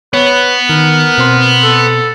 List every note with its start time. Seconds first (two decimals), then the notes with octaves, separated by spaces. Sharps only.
0.14 B3 B4 C#5
0.69 D#3 A#4
1.18 B2 C4 C6
1.63 A4